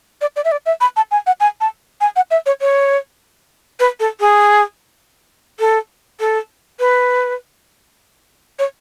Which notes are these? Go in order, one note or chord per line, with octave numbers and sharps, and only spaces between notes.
D5
D5
E5
D5
E5
B5
A5
G#5
F#5
G#5
A5
G#5
F#5
E5
C#5
C#5
B4
A4
G#4
A4
A4
B4
C#5